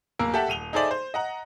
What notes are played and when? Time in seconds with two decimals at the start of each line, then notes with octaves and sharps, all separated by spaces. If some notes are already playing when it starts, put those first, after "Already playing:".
0.19 D1 A#3 A#4 E6
0.34 G4 A4 E5 F#5 A5
0.48 D#1 D#7 F7 G7
0.73 D#4 G#4 A4 C5 D5 E5
0.91 C5
1.14 D#5 F#5 A#5